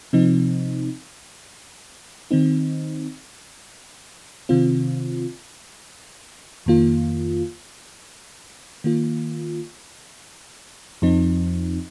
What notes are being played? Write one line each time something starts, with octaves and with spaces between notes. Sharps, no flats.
C3 F3 C4 D#4
D#3 C4 D#4
C3 D#3 C4 F4
F2 D#3 A#3 F4
D#3 A#3 F4
F2 F3 C4 D#4